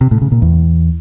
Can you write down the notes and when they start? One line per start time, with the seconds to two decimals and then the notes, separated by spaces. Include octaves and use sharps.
0.01 C3
0.11 A2
0.21 C#3
0.32 A#2
0.42 E2